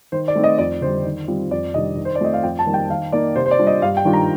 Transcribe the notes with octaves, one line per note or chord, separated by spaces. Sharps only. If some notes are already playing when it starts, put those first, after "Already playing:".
D#3 C5
D5
A3 C4 D#4
D#5
F2 D5
D3 G3 C5
D#3
G3 C4 F4
F2 D5
C3 D#3 G3 D4 D#5
D#3
C5
D5
A3 C4 F4 D#5
F5
F2 G5
A5
D#3 G3 A#3
G5
D#3 F5
A#3 D#4 D5
C3 C5
C5
D5
G3 D4 F4
D#5
G2 F5
G5
D#3 G3 D4 F4
A#5